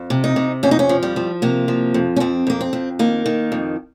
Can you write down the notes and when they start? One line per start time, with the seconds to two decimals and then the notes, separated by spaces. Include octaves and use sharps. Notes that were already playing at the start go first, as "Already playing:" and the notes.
Already playing: F2
0.10 C3
0.24 D#4
0.36 C3
0.63 F2 C#4
0.71 D#4
0.79 C#4
0.89 F3
1.03 G3
1.16 F3
1.42 C3 A#3
1.68 F3
1.94 F2
2.16 C#4
2.20 F2 C4
2.47 F2 A#3
2.61 C4
2.73 F2
2.99 D#3 A#3
3.26 D#3
3.52 F2